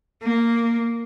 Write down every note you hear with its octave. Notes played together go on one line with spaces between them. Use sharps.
A#3